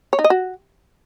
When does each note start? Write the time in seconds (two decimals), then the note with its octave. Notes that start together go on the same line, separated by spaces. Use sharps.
0.13 C#5
0.19 D#4
0.24 D#5
0.30 F#4